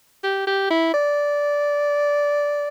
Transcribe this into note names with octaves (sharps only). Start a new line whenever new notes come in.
G4
G4
E4
D5